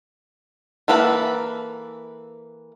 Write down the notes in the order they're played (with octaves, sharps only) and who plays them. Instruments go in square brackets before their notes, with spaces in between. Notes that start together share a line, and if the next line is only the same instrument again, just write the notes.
[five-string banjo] E3 A#3 A4 B4 B5